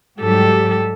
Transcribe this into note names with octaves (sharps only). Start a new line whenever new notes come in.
G#2 F#3 G3 G4 A4